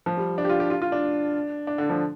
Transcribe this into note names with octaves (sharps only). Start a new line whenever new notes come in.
F3
G3
D4
G4
F4
G4
F4
F4
D4
D4
D3
F3